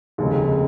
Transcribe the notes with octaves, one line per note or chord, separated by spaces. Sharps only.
F1 D#2 C#3 G#3